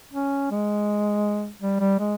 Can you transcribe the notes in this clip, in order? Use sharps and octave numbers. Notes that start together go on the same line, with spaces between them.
C#4
G#3
G3
G3
G#3